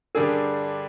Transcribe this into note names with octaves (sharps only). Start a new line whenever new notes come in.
G2 D3 G3 D4 G#4 A#4